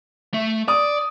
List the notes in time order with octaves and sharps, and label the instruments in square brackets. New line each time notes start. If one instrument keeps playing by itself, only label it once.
[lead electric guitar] A3
[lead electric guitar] D5 [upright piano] D#6